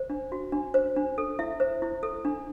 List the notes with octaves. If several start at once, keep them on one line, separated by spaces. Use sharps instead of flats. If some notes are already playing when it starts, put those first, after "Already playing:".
Already playing: C5
D4
F#4
D4
C5
D4
A4
E4 E5
C5
E4
A4
D4